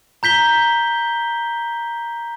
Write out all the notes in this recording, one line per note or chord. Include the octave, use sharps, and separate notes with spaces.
A#5 G6 B6 G7